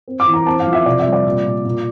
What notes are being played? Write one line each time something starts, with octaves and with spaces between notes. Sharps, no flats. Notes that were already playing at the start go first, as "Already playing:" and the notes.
C4
D6
E3
A#5
C4 A5
F5
F3
E5
C3 D5
E5
G3
D5
A#2
A#2
A#2